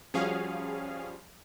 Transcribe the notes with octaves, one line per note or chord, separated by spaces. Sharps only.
F3 G3 C#4 F#4 G#4 F5